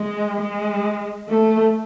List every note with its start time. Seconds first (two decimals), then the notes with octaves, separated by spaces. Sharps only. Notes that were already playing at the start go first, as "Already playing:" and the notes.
Already playing: G#3
0.41 G#3
1.29 A3